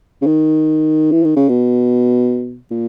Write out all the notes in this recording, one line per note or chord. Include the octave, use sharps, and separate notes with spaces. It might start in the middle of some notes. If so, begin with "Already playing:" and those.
C#3
D#3
E3
D#3
C#3
B2
A#2